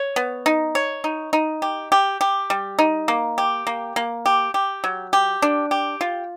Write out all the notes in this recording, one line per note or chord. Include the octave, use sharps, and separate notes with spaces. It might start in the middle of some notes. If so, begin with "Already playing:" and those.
Already playing: C#5
B3
D#4
C#5
D#4
D#4
G4
G4
G4
G3
D#4
A#3
G4
A#3
A#3
G4
G4
F#3
G4
D4
G4
F4